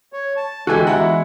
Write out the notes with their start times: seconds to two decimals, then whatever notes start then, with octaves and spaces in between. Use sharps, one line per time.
0.13 C#5
0.37 A5
0.67 D3 E3 G#3 F#4 G4 G#5
0.87 E2 E4 F#4 F#5 A#5